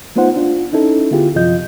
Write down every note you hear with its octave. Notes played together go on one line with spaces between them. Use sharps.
A3 B3 D#4 F4 C5 F#5
D4 F4
C#4 D#4 E4 A4
D3 B3 E4 F4 G4 G#4
F#2 C3 F3 F4 D#5 G6